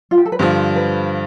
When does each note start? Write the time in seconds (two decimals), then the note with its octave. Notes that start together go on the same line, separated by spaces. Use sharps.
0.11 F4
0.18 G4
0.26 A4
0.32 B4
0.39 G2 D3 F3 C5
0.76 B4